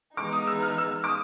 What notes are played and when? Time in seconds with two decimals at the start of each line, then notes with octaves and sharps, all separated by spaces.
0.16 E3 G#3 B3 D#4 D6
0.33 D#6
0.47 E6
0.62 F6
0.78 E6
1.04 D6
1.08 D#6